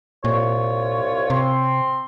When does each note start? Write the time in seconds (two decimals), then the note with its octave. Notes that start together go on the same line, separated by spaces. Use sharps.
0.25 C2 A#2 F4 C#5
1.30 C3 C4 C6